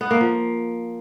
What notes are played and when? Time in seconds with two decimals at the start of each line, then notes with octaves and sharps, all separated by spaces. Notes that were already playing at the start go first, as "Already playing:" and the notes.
0.01 B3
0.11 A#3
0.21 F3